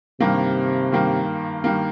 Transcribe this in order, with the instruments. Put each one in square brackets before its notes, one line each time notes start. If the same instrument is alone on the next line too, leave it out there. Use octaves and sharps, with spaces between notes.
[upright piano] G2 D#3 A#3 [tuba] C3
[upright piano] G2 D#3 A#3
G2 D#3 A#3